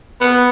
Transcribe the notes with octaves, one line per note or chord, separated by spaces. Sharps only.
B3